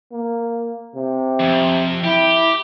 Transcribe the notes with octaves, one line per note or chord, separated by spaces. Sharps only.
A#3
C3
F2
E4 G4